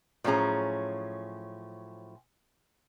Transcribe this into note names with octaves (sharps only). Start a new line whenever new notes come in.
A2 F3 F#3 C#4 G#4 A#5